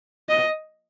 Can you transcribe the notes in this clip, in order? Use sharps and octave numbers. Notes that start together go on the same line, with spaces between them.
D#5